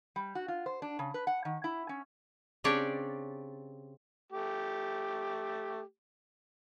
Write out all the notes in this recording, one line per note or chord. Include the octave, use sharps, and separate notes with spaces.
G3
F#4
F4
C5
D4
C#3
B4
F#5
D#3
E4
C#4
C#3 C4 D4 G4 C#5 D5
A3 G4